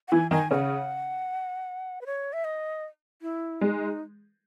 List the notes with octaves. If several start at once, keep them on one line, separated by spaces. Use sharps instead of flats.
F#5
E3 E4 G#5
D#3 D#4 G#5
C#3 C#4 F#5
B4
C#5
E5
D#5
E4
G#3 D#4